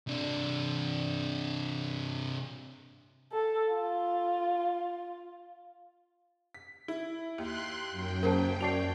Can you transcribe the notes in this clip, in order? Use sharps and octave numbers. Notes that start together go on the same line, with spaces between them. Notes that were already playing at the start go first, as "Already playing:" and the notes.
C3 D4
A4
F4
B6
E4
D#2 C6 F#6
F#2 G5
C#3 A#3 A#4 C5 A5
F#4 C#5 D5 A5 C7 F7